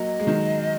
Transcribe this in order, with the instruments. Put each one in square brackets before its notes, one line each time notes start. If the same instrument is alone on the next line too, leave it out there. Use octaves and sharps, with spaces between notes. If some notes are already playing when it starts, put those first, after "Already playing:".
Already playing: [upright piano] F#3 A#3 [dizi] D#5
[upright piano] G#3
D#3 F#3